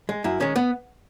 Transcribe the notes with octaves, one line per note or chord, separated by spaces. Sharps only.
G#3
F#2 E4
D#3 G#3 C#4
B3